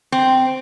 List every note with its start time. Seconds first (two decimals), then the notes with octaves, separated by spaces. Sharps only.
0.12 C4